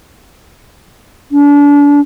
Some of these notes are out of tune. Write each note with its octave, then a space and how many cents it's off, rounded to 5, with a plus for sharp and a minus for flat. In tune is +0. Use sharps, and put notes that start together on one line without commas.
D4 -35